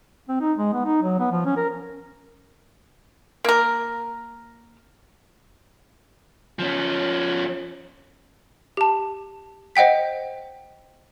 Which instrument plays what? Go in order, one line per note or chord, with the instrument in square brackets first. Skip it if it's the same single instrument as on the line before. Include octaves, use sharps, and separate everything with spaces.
[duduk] C4
D#4
G#3
B3
D#4
F#3
B3
F3
C#4
A#4
[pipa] A#3 A#4
[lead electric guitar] F3 C#4
[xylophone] G4 A5
C5 D#5 F#5 G5 B6